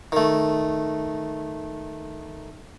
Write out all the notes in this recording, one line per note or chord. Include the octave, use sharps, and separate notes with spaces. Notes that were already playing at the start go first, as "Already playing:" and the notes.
D#3 A3